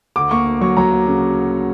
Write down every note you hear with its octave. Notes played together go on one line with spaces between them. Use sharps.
D2 D6
A#3 C#6
D2
F#3 C#6
F#3 A#5
A#3
C#3